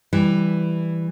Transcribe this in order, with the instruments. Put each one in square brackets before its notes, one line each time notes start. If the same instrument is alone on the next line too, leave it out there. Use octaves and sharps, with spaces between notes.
[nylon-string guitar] E3 G3